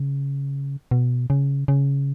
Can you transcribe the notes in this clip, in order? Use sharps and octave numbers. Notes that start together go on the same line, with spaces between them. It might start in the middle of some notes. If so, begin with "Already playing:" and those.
Already playing: C#3
B2
C#3
C#3